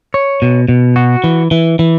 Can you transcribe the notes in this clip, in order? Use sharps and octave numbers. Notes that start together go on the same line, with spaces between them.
C#5
B2
B2
F#4
E3
E3
E3